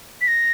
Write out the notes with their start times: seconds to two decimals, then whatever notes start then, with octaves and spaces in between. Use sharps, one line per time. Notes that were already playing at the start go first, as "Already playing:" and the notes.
0.21 B6
0.28 A#6